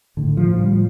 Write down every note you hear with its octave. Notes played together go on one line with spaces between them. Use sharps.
A2 D3
F3
A2
G3